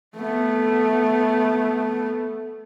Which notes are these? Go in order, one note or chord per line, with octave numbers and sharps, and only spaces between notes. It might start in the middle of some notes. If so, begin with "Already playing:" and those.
A3 B3